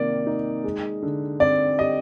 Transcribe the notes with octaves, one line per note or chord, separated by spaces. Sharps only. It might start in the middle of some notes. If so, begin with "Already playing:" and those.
Already playing: C3 D#3 A#3 D5
D#4
G#3
D3
C4 D5
G4 D#5